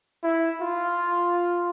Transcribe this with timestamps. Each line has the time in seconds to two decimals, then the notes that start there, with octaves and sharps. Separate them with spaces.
0.23 E4
0.62 F4